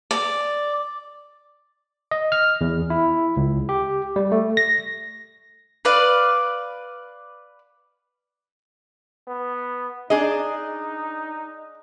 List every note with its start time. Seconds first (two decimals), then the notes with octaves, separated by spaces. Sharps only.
0.11 D5
2.11 D#5
2.32 F6
2.61 E2
2.90 E4
3.37 C#2
3.69 G4
4.16 G3
4.32 A3
4.57 A#6
5.85 B4 D5 F5
9.27 B3
10.10 D4 D#4 G#4 D#5